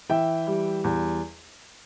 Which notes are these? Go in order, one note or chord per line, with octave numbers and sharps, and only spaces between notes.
E3 E5 G5
G3
E2